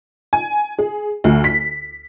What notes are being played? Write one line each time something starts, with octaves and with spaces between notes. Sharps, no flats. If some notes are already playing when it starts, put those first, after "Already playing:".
G#5
G#4
D2
B6